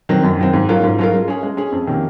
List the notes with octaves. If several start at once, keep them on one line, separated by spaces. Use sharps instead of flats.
D#3 F#3 C4
F#2
D#3 F#3 C4
G#2
F#3 C#4 F4 A#4
G#2
F#3 C#4 F4 A#4
G#3
C#4 G#4
G#3
C#4 G#4
F2
C3 D#3 A#3 C#4